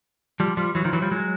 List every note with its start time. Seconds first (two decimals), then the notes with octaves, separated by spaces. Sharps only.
0.40 F3 G3
0.57 F3 G3
0.75 E3 F#3
0.85 D#3 F3
0.93 E3 F#3
1.02 F3 G3
1.12 F#3 G#3